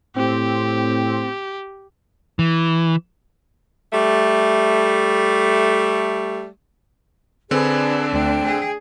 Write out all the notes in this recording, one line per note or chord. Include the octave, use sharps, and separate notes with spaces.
A2 C4 G4
E3
G3 A3
D3 C4 D4 G#4 B4
D2 G5
G#4